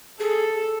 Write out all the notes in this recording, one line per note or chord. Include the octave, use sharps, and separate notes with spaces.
G#4 A4